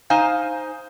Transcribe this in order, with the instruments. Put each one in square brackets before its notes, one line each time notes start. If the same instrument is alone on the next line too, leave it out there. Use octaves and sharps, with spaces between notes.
[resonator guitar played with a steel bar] D#4 C5 F5 G#5